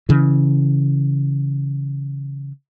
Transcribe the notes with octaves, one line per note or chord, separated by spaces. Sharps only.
C#3 E3